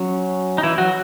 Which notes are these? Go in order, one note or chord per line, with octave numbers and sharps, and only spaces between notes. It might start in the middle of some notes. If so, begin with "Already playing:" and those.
Already playing: F#3 C#4
D#4
E3 E4
F#3 F#4